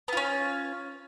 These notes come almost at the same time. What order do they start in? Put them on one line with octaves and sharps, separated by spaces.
B3 F4 C#4